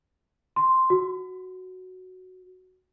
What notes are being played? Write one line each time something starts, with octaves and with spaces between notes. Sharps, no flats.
C6
F#4